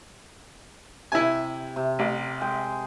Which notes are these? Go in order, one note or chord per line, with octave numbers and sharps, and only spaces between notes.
C3 E4 G#5
C3
A1
G#3 G5